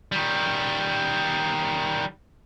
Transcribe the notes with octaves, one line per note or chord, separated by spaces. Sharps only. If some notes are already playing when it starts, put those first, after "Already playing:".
D#3 G3